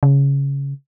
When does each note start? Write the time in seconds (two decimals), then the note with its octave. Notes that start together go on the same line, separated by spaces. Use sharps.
0.03 C#3